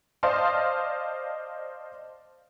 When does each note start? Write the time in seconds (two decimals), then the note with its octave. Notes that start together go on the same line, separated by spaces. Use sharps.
0.23 C5 D5 D#5 F5 A5 C6